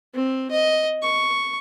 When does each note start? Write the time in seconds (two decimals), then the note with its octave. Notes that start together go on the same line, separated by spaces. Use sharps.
0.15 C4
0.51 D#5
1.02 C#6